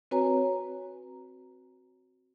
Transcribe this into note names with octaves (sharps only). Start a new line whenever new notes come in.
C4 F#4 B4 C#5 G#5 A#5